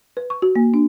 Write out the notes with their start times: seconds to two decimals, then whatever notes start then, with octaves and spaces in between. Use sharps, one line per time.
0.17 B4
0.30 C#6
0.42 F#4
0.56 A#3
0.74 D4